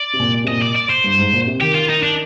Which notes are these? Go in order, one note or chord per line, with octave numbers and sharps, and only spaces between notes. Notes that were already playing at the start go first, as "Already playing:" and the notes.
Already playing: D5
C3
A#2
C3
A#2 D#5
D5
D5
C5
G2
G#2
A#2
C3
D#3 G4
F4
D#4
D4